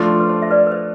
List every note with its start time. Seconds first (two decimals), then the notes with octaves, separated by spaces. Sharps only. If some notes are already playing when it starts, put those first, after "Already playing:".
Already playing: F3 A3 D4 F4
0.20 B4
0.29 C5
0.42 E5
0.51 B4 D5
0.67 B4
0.72 C5